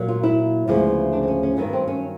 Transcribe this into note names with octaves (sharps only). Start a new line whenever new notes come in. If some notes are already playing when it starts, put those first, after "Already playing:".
Already playing: A#2 F#3 A#3
F4
E4
D2 C#3 F3 G#3 B3
D4
C4
C#4
C#4
G2 D#3 F#3 B3
C4
C#4